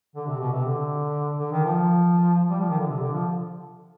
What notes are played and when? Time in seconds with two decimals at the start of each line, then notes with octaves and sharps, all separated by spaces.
0.16 D3
0.27 C3
0.40 B2
0.52 C3
0.65 D3
1.39 D3
1.52 D#3
1.65 F3
2.50 G3
2.59 F3
2.69 D#3
2.78 D3
2.88 C3
3.01 D3
3.12 F3